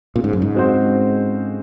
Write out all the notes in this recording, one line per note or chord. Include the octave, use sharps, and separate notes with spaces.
A#2 C#3
G#2
F#2
G#2
G#3 C4 F#4 C5